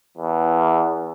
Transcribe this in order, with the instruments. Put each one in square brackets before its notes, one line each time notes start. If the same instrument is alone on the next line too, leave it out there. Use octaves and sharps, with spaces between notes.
[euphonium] E2